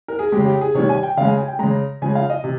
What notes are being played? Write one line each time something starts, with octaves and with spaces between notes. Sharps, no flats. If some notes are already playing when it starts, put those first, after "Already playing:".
A#4
G#4
G#3 G4
C#3
G4
G#4
C3 D#3 G3 C#5
G#5
G5
C#3 G#3 F5
G#5
G#5
G5
C#3 G#3 A#5
C#3 F3 G#3 G#5
F5
D#5
C3